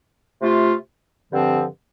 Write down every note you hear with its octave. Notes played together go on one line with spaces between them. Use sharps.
C3 A3 F4
G2 D3 F3 C4